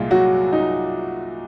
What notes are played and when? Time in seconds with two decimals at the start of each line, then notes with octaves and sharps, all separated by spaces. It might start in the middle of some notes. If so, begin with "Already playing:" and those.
Already playing: C2 A#2 G#3 F4
0.11 F#3 F#4
0.53 D#4